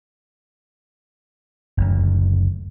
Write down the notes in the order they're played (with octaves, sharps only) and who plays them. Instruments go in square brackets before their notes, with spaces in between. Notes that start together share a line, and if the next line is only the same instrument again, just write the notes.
[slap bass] F#1 D2